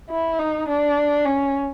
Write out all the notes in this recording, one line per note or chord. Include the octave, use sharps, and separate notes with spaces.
E4
D#4
D4
C#4